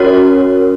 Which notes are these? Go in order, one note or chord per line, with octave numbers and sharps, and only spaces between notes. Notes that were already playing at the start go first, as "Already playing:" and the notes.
Already playing: C#4 F#4 A#4 C#5